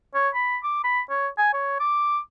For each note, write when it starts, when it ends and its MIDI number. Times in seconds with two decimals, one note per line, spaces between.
0.15 0.29 73
0.34 0.57 83
0.63 0.79 86
0.84 1.00 83
1.10 1.28 73
1.38 1.52 80
1.54 1.75 73
1.80 2.19 86